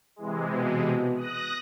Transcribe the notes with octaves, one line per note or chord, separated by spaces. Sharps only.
C3 E3 G#3
B2
D#6 F#6 A#6